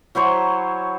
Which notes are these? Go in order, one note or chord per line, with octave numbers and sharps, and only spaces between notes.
F#3 E4 C5 C#5